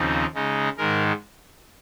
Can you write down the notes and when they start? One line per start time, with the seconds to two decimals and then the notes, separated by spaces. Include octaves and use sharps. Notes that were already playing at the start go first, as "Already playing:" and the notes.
Already playing: D#2 C#3 F3 C4 D#4
0.35 C#3 G#3 D#4
0.77 G#2 D#3 G#3 A#4